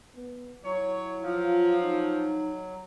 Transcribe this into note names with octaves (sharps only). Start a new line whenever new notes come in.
B3
F#3 E4 C#5
F3 F4
D#4